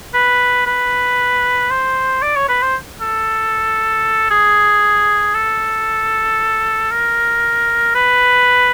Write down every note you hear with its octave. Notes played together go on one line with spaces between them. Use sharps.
B4
B4
C5
D5
C#5
B4
C5
A4
G#4
A4
A#4
B4